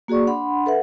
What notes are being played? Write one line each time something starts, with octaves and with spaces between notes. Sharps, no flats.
A#3 F#4 G#4 D5 C#6
D4 F#5 B5 C6
A4 B4 E5 F#5